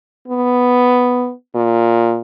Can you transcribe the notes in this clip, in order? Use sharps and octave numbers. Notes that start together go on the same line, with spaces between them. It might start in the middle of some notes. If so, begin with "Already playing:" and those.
B3
A#2